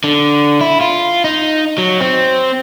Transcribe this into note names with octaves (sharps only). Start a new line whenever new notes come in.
D3
E4
F4
D#4
F#3
C4